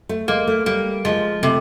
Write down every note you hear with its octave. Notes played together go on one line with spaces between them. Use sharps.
A3
G#3 A#3
A3
G3 A#3
F3 G#3
C3 A3